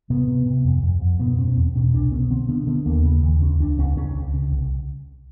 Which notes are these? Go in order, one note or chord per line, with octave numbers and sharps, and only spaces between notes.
C3 B3
C3
C3
F2
F2
F2
B2 B3
B2 C4
C#4
E2
B2 C#4
C2 D4
B2 C#4
D3 C4
D3 B3
D3 B3
D#2 A#3
C#3
D#2
C#2 C#4
C#2 D4
C#2 C#4
C#2 C#4
C#2
C#3
C2